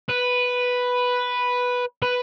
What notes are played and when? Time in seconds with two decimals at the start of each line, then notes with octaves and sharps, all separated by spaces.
0.09 B4
2.02 B4